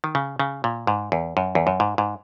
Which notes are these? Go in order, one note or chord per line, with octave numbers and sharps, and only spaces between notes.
D#3
C#3
C#3
A#2
G#2
E2
F#2
E2
F#2
G#2
G#2